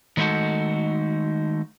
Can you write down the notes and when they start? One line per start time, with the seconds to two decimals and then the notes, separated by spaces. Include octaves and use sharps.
0.17 D#3 G#3 A3 D#4 F#4 A4